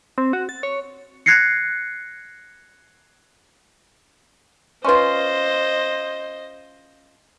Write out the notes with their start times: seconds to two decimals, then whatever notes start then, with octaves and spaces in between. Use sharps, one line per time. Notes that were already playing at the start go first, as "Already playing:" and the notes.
0.18 C4
0.33 F#4
0.49 A6
0.63 C#5
1.26 F#6 G#6 A#6 C7 C#7
4.84 C#4 F4 B4 C5 D#5 C6 C#6